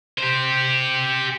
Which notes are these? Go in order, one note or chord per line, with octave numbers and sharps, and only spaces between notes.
G4 C5